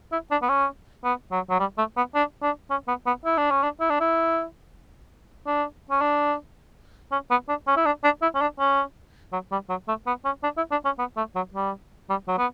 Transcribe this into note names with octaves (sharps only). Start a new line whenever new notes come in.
E4
D4
B3
C#4
B3
F#3
F#3
G3
A3
B3
D4
D4
C#4
B3
B3
E4
D4
C#4
D4
E4
D4
E4
D4
C#4
D4
C#4
B3
D4
C#4
E4
D4
D4
E4
C#4
D4
C#4
F#3
G3
F#3
A3
B3
C#4
D4
E4
D4
C#4
B3
A3
F#3
G3
G3
F#3
B3